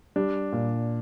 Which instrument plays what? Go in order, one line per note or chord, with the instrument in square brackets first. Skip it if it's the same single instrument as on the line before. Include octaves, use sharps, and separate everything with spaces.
[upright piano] G3 [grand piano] D4
[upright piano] A#2